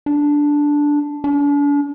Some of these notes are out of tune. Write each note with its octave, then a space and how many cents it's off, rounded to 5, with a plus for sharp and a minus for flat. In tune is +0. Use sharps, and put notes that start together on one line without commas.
D4 -5
D4 -40